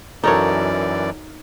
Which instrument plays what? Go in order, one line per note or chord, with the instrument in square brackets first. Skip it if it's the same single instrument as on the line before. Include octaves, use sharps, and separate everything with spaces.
[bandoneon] F#2 E3 D5 [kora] D#4 C#5 [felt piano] F#4 A4 A#4